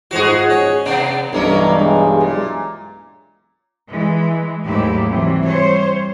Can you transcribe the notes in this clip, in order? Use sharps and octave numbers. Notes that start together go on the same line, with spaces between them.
G#2 F3 F#4 G#4 F5
C#4
C3 B3 D4
B1 G2 E3 G3 A#3 C#4 D4 A#4
G#3
A#2
E3 G#3
D#2 G#2 F#3 A3 E4 G4
C3 E3 F#3 G3
G3 C5 C#5